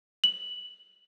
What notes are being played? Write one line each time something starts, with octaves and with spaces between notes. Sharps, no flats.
F#7